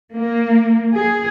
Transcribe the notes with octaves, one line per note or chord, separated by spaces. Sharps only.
A#3
G#4